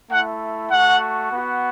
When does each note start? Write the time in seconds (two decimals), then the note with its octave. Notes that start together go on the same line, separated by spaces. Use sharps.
0.10 A3 E4 F#5
0.71 A3 F#4 F#5
1.32 B3 F#4